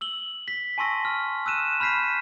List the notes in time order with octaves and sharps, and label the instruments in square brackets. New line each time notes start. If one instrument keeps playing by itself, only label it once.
[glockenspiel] E6 F#7 G7
B6
G#5 A5 C6 C#6 E6 A#6
F6
E6 F#6 D#7 E7
B5 F6 G6 B6 C7 D#7